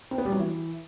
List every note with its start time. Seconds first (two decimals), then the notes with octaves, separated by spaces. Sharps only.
0.11 C4
0.18 B3
0.25 G3
0.32 F#3
0.39 E3